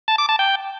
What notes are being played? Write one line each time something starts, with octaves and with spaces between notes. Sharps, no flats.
A5
D6
A5
G5